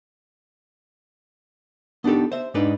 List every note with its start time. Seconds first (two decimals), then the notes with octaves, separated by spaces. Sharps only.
2.04 B3 D4 D#4 G4 A4
2.32 C5 E5
2.54 G#2 G#3 D4 D#4 B4 D5